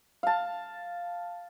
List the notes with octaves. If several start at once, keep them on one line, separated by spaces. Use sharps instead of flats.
F5 A5